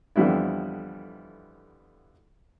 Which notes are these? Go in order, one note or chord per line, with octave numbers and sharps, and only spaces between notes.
F2 D3 E3 G3 B3 E4